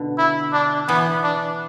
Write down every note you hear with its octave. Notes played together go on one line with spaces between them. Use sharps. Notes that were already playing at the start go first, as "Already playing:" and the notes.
Already playing: B2 D3
E4
D4
E3 B3
D4